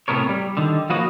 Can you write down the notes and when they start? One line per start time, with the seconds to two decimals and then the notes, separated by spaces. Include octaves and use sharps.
0.08 A2 C3 A3 B3 A#4 C#5
0.29 G3
0.57 D3 D#3
0.90 F3 A#3 F#4 B4 C#5 D#5